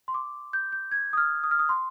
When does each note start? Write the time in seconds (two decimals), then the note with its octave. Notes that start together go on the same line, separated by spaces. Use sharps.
0.08 C6
0.14 D6
0.53 G6
0.72 G6
0.91 G#6
1.13 D#6
1.17 F6
1.44 D#6
1.51 F6
1.59 D#6
1.69 C6